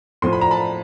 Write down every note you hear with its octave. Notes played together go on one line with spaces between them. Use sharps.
A2 F3 C6
B5
A#5
A5 B5